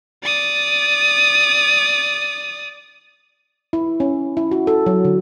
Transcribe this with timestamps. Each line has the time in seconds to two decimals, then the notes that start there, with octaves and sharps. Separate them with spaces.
0.23 D5 D#6
3.73 E4
4.00 C#4
4.37 E4
4.51 F#4
4.67 A4
4.86 F#3
5.05 D3